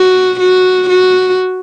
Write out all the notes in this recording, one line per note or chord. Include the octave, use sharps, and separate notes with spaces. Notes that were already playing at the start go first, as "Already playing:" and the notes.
Already playing: F#4
F#4
F#4